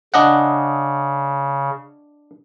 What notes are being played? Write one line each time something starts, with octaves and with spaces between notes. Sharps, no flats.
C#3 D4 D#5 F#5